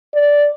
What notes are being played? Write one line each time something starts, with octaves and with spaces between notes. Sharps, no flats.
D5